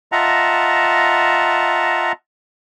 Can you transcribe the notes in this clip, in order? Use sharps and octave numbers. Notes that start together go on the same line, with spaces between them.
F4 D#5 E5 F#5 A5 A#5